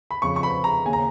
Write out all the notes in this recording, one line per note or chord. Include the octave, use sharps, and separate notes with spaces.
B5
F2 C#3 C#6
C#6
B5
A#5
D#2 C#3 G#5
A#5